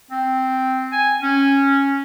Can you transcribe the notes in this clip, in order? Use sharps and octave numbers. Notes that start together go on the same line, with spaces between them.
C4
G#5
C#4